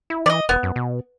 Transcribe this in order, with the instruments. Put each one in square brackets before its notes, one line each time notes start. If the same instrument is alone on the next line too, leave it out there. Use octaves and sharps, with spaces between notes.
[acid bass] E4
[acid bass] E3 [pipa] D5 D#5
[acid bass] E1 [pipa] B3
[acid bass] F#2
B2